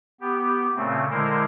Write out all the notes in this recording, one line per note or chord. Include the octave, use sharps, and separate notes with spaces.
B3 G4
A#2 C#3 A3 C4
D3 G#3 E4 A#4 C5